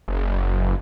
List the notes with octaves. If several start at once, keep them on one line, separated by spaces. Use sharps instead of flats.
F#1